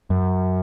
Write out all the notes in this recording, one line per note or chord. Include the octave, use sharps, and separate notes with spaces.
F#2